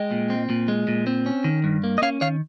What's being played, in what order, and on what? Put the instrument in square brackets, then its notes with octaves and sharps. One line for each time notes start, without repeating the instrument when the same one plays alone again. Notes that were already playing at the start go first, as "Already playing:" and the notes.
Already playing: [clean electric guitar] G#3 D#5 G5
A#2
C4
A#2
G#3
A#2
C4
C#4
D#3
G2
A#3
D#5
C#4 C#5 F5
D#3 C#5 F5